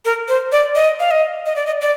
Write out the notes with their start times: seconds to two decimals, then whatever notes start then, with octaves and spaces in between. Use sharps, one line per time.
0.05 A#4
0.28 C5
0.52 D5
0.75 D#5
1.00 F5
1.11 D#5
1.46 D#5
1.56 D5
1.66 D#5
1.81 D5